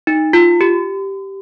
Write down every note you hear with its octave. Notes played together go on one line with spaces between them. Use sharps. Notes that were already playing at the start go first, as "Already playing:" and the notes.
D#4
F4
G4